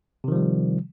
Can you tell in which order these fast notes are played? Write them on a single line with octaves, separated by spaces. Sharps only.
C3 D#3 F3 G3